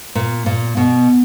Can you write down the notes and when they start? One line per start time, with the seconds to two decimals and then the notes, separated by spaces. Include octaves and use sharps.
0.15 A#2
0.46 A#2
0.77 B2